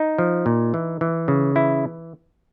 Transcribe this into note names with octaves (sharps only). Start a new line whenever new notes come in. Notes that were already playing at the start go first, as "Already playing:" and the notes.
Already playing: D#4
F3
A#2
E3
E3
C#3
E3 E4